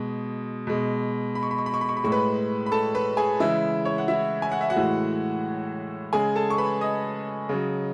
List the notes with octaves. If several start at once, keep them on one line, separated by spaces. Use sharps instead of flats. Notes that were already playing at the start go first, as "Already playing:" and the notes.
Already playing: B2 G#3
B2 G#3
B5
C#6
B5
C#6
B5
C#6
B5
C#6
B5
A2 G#3 C#6
B4 B5
B5
A4 A5
B4 B5
G#4 G#5
C#3 E3 G#3 E4 E5
C#5
F#5
E4 E5
G#5
F#5
E5
F#4 F#5
A2 E3 G#3
C#3 G#3 G#4 G#5
A4 A5
C#6
B4 B5
D#5 D#6
C#3 F#3